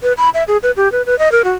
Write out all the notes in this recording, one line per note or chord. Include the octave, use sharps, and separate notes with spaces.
B4
B5
E5
G#4
B4
G4
B4
B4
D#5
A#4
F#4